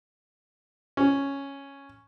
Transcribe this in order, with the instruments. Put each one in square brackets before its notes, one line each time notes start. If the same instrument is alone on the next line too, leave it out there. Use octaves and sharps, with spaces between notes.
[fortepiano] C#4